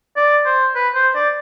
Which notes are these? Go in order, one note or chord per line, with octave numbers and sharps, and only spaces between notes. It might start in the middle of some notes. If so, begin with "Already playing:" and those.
D5
C5
B4
C5
D5